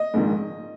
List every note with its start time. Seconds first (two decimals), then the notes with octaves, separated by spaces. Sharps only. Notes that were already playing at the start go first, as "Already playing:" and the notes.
Already playing: D#5
0.14 A#1 G#2 D#3